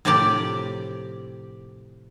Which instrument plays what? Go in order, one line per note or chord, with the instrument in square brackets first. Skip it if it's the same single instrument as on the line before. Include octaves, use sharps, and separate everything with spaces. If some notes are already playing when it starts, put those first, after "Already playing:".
[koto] A2 C3 F3 G4 D5